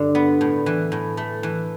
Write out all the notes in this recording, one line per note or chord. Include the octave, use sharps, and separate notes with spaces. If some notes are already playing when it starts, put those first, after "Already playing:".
Already playing: G2 D3
B3
A2
E3
A2
A3
E3